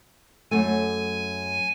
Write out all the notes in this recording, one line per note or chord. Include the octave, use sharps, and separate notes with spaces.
F#2 A3 G#5